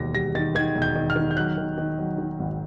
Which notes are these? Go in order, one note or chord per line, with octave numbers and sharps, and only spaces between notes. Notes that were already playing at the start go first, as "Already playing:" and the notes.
Already playing: E1 D#2 A#6
G3 A#6
D#3 A6
D#3 G#6
E1
G6
D#3
F6
D#3
G6
F#3 F#6
D#3
D#3
F#3
D#3
G#1